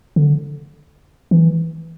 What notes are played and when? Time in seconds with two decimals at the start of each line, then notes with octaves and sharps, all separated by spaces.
0.16 D3
1.31 E3